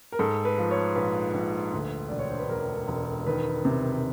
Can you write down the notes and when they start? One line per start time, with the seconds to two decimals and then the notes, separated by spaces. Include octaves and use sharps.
0.12 A#4
0.19 G#2 A4
0.45 B4
0.58 F3
0.71 C#5
0.96 A#1 B4
1.34 A#1
1.73 D2
2.09 E1 D5
2.19 C#5
2.29 C5
2.39 B4
2.49 E1 A#4
2.88 E1
3.26 D#3 B4
3.65 C3